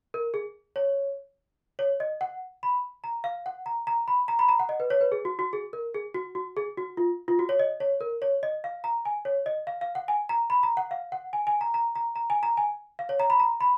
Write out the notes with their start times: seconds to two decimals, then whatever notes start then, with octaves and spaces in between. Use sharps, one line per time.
0.14 A#4
0.34 G#4
0.76 C#5
1.79 C#5
2.00 D#5
2.21 F#5
2.63 B5
3.04 A#5
3.24 F5
3.46 F#5
3.66 A#5
3.87 A#5
4.08 B5
4.28 A#5
4.39 B5
4.49 A#5
4.59 F#5
4.69 D#5
4.80 B4
4.90 C#5
5.01 B4
5.12 G#4
5.25 F#4
5.39 F#4
5.53 G#4
5.73 A#4
5.94 G#4
6.14 F#4
6.35 F#4
6.57 G#4
6.77 F#4
6.97 F4
7.28 F4
7.39 F#4
7.49 C#5
7.59 D#5
7.80 C#5
8.01 A#4
8.22 C#5
8.43 D#5
8.64 F5
8.84 A#5
9.05 G#5
9.25 C#5
9.46 D#5
9.67 F5
9.81 F5
9.95 F#5
10.08 G#5
10.29 A#5
10.50 B5
10.63 A#5
10.77 F#5
10.91 F5
11.12 F#5
11.33 G#5
11.47 G#5
11.61 A#5
11.74 A#5
11.96 A#5
12.16 A#5
12.30 G#5
12.43 A#5
12.57 G#5
12.99 F5
13.09 C#5
13.20 A#5
13.30 B5
13.40 A#5
13.61 B5